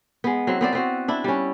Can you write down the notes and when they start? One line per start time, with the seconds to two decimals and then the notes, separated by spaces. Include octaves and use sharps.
0.24 G#3 B3
0.47 F#3 C4 E4
0.61 B3 C4 D5
0.73 B3 C4 F#4
1.08 D4 E4
1.24 G3 C#4